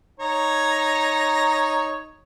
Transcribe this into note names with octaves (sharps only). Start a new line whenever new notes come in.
D#4 C#5 A#5